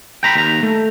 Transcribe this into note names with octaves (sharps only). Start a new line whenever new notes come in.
G5 A#5 B5
D#2 A#5
A3